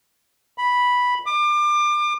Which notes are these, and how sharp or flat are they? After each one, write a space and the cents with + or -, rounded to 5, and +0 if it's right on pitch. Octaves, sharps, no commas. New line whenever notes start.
B5 -5
D6 +30